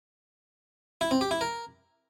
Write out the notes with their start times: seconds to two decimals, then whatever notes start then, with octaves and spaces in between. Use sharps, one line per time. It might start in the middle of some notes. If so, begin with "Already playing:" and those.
1.01 E4
1.11 C4
1.21 G4
1.31 E4
1.41 A#4